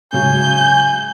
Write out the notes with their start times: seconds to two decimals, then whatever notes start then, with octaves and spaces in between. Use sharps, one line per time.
0.13 G#2 C#3 F#3 G#5 G6